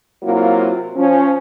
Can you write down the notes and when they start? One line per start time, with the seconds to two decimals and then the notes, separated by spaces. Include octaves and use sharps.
0.23 C3 F#3 A#3 E4 F4
0.96 F3 C#4